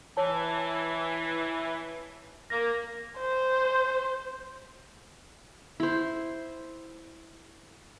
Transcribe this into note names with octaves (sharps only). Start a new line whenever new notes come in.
E3 C#5 A5
A#3 A#6
C5
E4 C5